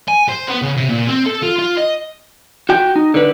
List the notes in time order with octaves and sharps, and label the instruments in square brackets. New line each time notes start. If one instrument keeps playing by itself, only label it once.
[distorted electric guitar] G#5
C5
B3
C#3
C3
A#2
C4
A4
F4
F4
D#5
[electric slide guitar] F#4 G5
D#4
D3 B4